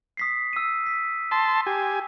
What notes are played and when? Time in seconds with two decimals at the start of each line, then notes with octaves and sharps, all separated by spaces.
0.17 D#6 B6 C7
0.53 E6 D#7
0.86 B6
1.31 A5 C6
1.67 G4 G#5